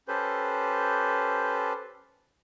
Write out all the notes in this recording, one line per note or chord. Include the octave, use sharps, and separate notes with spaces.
C#4 G4 A4 B4 C5